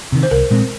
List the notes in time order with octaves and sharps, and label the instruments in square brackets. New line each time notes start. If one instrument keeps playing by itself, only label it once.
[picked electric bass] C3 D#3
[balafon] C5
[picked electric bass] C2 [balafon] A#4
[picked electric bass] A#2 G#3 C4